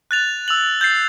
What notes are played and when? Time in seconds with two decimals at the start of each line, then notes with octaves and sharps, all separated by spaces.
0.11 F#6 A6 F7
0.48 E6 F7 F#7
0.81 G6 A6 C7